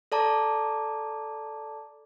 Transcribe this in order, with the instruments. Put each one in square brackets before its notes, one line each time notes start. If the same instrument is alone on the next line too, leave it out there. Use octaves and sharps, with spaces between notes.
[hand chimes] A4 D5 A5 A#5 D6